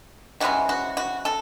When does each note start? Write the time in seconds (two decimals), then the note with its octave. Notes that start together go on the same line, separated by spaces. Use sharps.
0.40 C3 E3 G#3 C#4 F#4
0.69 F#4
0.97 F#4
1.25 A4